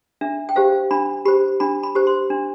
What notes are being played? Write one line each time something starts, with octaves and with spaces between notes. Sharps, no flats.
D4 E5
G5
G4 C5 F5
D4 B5
G4 C5 B5
D4 B5
B5
G4 C5
C6
D4